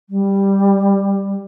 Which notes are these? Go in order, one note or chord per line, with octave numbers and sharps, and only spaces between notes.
G3